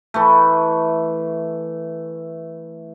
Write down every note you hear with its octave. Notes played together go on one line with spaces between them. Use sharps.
E3 A3